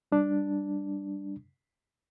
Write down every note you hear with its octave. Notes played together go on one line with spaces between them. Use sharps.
G3 D4